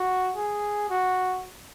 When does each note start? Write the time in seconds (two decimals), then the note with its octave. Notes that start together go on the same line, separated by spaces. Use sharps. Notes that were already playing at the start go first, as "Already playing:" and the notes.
Already playing: F#4
0.36 G#4
0.90 F#4